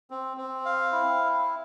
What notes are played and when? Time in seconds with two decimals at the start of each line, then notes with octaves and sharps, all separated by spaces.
0.11 C4
0.37 C4
0.66 F5
0.93 E4